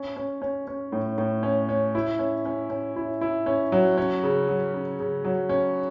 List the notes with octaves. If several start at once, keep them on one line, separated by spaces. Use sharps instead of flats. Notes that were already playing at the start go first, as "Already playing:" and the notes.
Already playing: C#4
C#4
C#4
C#4
A2
A2
C#4
C#4
E4
C#4
C#4
C#4
E4
E4
C#4
F#3
C#4
C#3
F#3
C#3
C#3
F#3
C#4